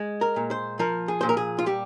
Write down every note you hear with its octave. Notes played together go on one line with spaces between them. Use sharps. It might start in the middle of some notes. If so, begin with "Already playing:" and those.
Already playing: G#3
A#4
A#2
C5
F3 A#4
G#4
A#2 C5
A#4
G#4
F4
G3 G4